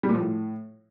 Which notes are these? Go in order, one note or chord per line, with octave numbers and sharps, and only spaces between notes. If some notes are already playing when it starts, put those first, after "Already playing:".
G3
A#2
F3
A2